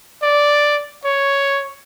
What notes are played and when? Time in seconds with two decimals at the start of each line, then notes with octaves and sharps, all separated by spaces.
0.23 D5
1.05 C#5